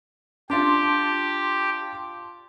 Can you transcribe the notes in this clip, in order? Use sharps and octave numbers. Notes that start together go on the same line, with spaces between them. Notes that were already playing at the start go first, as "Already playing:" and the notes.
D4 F4 G4 A5 C6 D6